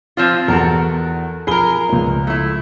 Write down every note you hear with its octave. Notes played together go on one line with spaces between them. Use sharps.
F3 C4 F4
E2 F#4 A4 A#4
F3 G#4 A#4 B5 G7
C#2 F3
A3 E4